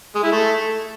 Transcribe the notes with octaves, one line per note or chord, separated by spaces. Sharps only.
G#3
E4
A3